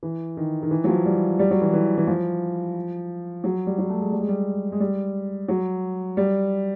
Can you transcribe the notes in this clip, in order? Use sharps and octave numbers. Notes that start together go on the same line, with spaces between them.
E3
D#3
D#3
E3
F#3
F3
G3
G3
F#3
E3
E3
E3
F3
F#3
G3
F#3
A3
G#3
G3
G#3
G3
G#3
G3
F#3
G3